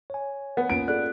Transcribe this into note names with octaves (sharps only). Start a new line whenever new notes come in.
C#5 G#5
B3
A#3 C#4 F4 D7
F4 G#4 A4 D5 F#6